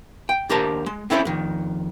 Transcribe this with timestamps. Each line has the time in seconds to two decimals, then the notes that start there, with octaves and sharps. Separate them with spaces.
0.29 G5
0.49 D#2 D4 G4 A#4 C5 A5
0.86 G#3
1.10 C4 C#4 E4 A4 A#4 C5
1.25 F2 D#3